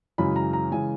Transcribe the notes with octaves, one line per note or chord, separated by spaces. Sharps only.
F#2 C#3 E3 G#3 B5
A#5
A#5
C#3 E3 G#3 G#5